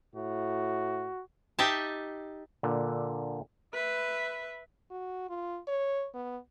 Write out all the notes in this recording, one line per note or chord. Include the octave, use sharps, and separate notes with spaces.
A2 F#4
D#4 G4 D#5 E5 A5
A#2 D3
B4 E5
F#4
F4
C#5
B3